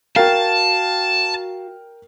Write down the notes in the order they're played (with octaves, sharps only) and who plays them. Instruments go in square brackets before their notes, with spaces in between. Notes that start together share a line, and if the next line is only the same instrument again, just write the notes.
[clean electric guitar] F#4 F5 [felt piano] A#4 G5 [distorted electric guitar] A5